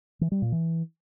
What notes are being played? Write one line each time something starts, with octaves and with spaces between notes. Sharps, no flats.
E3
G3
A#2
E3